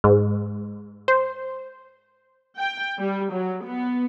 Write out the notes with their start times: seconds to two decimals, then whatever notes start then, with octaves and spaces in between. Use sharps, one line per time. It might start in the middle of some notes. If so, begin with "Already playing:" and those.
0.04 G#2
1.08 C5
2.58 G5
2.99 G3
3.32 F#3
3.66 B3